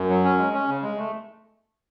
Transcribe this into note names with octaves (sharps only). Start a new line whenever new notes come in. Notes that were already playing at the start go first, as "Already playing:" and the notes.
Already playing: F#2
F#3
C#4
G#3
C#4
C#3
G#3
A3